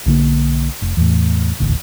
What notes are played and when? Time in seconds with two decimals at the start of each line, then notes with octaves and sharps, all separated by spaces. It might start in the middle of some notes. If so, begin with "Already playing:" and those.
0.06 B1 D3 A#3
0.82 F1
0.97 E2 A2
1.60 D#1 A1 D2